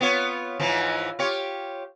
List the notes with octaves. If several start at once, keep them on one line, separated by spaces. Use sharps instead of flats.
B3 F4 C#5
G#2 E3 F3
F4 G4 C#5